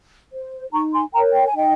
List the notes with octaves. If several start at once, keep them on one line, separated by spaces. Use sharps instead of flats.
C5
D#4 A#5 C#6
G#5 C6
A#4 C#5 G5 A#5
G5
G#5
D#4 D#5 G5